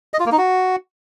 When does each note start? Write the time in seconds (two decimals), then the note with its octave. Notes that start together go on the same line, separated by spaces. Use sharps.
0.14 D#5
0.20 F4
0.26 A#3
0.32 D#4
0.38 F#4